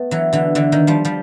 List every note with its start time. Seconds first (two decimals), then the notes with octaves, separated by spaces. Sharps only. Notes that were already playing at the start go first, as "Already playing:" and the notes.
Already playing: A3 B3
0.11 E3 F#3
0.33 D3 E3
0.55 D3 E3
0.72 D#3
0.87 F3 G3
1.05 F3 G3